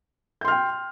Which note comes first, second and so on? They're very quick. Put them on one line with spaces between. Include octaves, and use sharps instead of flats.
G6 C6 F6 G5